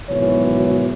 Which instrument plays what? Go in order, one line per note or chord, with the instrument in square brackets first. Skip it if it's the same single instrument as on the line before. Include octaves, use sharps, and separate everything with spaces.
[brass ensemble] G#1 B2 E3 F#3 C#5